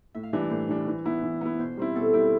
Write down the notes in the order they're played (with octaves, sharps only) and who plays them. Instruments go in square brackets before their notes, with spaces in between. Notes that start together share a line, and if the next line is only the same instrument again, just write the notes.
[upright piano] A2 [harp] E5
[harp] F5
[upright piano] E3 G3 D4 [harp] E5
[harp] D5
[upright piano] A2 [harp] C5
[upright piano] E3 G3 D4
E3
B3 E4
E3
B3 E4
[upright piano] B2 [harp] C5
[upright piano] G3 C4 E4
[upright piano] B2 [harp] A4
[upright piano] G3 C4 E4 [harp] G4